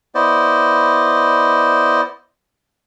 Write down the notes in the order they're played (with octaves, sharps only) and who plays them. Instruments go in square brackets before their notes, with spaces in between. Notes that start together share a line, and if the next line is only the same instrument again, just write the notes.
[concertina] B3 E4 C5 D5 D#5